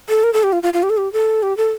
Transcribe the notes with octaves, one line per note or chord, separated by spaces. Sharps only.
A4
A#4
A4
G4
F4
F4
F4
G4
A4
G4
A4
G4
A4